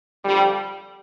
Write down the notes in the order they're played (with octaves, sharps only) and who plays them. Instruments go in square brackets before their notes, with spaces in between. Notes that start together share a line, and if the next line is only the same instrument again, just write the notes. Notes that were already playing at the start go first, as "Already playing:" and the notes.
[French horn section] F2 D3 F3 G3